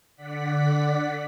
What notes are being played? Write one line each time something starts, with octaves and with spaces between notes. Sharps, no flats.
D3 D5 F#5 B6